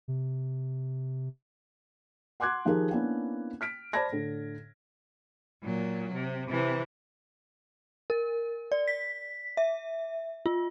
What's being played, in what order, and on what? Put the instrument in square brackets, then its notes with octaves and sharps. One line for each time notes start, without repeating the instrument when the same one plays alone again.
[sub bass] C3
[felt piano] F#5 C6 D6 F#6 G#6
D#3 F3 D#4 G4 G#4 A#4
A#3 B3 C#4 D4 E4
F6 B6 D7
C5 D5 A5 B5 G#6 A#6
A2 D3
[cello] A#2 F#3
C3
C3 E3
[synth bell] A#4
D5
B6
E5
F4